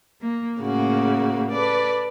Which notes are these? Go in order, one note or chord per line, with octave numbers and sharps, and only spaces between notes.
A#3
A2 C#3 A#3 F#4
A4 B4 D5